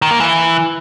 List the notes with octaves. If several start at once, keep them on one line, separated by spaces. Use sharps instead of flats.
D#3
A#3
E3